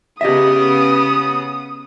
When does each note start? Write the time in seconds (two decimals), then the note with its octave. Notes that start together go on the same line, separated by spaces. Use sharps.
0.21 C#3 B3 G4 D#5 E5 D#6